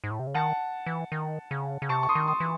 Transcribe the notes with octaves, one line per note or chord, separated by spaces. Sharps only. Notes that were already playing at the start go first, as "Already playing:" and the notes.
G#2
A2
C3
C#3
D#3 F#5 A5
E3
D#3
C#3
C#3
C3 A5 C#6
C#6
C6 D#6
D#3
C6 D#6
E3